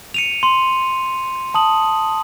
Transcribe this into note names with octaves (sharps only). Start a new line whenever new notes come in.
C#7 D#7 F7
C6
A5 D#6 F#7